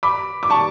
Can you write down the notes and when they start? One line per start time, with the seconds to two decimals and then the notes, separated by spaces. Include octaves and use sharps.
0.03 B5 D6
0.43 D6
0.50 A5 C#6